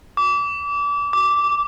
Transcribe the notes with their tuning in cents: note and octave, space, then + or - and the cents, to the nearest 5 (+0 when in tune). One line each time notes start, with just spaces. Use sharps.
D6 -30
D6 -10